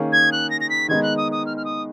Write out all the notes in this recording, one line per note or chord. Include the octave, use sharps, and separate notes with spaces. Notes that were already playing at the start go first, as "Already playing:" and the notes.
Already playing: D#3 A#3 C#4 G#4
G#6
F#6
A#6
A#6
B6
D#3 G#3 B3 D#4 G#6
F#6
D#6
D#6
F6
F6
D#6